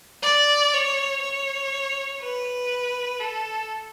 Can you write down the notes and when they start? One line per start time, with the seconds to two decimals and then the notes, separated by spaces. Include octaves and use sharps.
0.22 D5
0.73 C#5
1.22 C#5
2.21 B4
3.20 A4